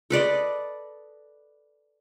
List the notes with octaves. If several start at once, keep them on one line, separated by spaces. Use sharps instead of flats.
A4 B4 D5 D#5